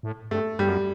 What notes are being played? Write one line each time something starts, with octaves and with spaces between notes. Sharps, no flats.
A2
G2 A3
G2 G3
F#2